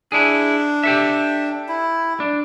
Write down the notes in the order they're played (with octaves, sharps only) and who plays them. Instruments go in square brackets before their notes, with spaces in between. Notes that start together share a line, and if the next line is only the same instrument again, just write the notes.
[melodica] D4 [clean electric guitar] E4 G#4
[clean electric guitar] G4 A4 E5
[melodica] E4
[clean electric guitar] D4